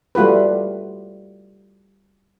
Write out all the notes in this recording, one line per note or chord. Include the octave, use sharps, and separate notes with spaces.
G3 A3 F4 F#4 B4